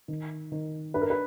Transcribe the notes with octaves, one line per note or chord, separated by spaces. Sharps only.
D#3
D#3
D4 B4
A#4
B4